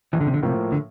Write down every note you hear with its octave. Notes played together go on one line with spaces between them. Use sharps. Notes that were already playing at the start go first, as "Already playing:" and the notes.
A#1 E3
D3
C3
D3
A2 C3 F3 A#3
D3